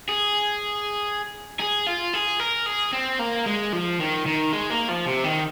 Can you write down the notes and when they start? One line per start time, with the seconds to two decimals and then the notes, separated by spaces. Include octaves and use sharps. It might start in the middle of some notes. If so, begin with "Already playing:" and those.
0.09 G#4
1.60 G#4
1.86 F4
2.13 G#4
2.40 A#4
2.66 G#4
2.93 C4
3.19 A#3
3.46 G#3
3.73 F3
4.00 D#3
4.26 D#3
4.53 G#3
4.70 A#3
4.88 F3
5.06 C3
5.24 D#3